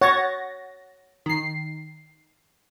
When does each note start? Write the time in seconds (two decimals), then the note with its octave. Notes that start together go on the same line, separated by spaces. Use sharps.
0.01 C#5 F#5 A6 A#6
1.26 D#3 C7